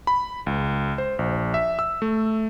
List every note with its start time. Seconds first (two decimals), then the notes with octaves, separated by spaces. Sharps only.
0.07 B5
0.47 C#2
0.98 C5
1.19 A#1
1.54 E5
1.79 E6
2.02 A3